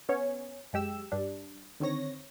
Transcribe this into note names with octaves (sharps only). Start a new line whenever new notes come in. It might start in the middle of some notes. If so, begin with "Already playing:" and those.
B3 C#4 C#5
F#2 G#3 G4 E6
G2 G3 D4
D3 D#3 C4 C#5 A#6